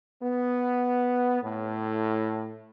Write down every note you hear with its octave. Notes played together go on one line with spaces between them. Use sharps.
B3
A2